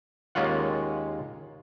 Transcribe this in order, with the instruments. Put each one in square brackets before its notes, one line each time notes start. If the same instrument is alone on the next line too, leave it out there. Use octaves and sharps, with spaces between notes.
[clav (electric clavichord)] D#2 G#3 A#3 C#4 F4 F#5